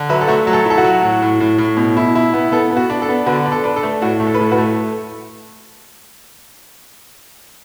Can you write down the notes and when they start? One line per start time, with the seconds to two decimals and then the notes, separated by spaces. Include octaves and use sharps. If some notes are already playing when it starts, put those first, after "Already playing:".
Already playing: D3
0.09 F#3 B4 E5
0.21 A4
0.28 A3 F#4
0.47 F#3
0.53 A4
0.65 E4 A4
0.78 F#4
0.84 F#3
1.02 A2
1.22 A2
1.40 A2
1.58 A2
1.77 B2
1.97 E4
2.15 E4
2.34 B3
2.52 B3 A4
2.71 B3
2.77 F#4
2.90 D4
3.02 A4
3.09 B3
3.26 D3 F#4 B4
3.46 D4
3.52 A4
3.64 D4 B4
3.76 A4
3.83 A3
4.02 A2 F#4
4.20 A3
4.27 A4
4.34 B4
4.39 A2 A4
4.52 F#4 B4
4.58 A3